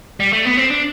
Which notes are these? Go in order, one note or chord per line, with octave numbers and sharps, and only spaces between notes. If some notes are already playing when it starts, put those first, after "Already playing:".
G3
A3
B3
C4
D4